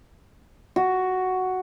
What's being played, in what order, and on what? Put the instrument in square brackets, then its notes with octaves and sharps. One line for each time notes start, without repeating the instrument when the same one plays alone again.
[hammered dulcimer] F#4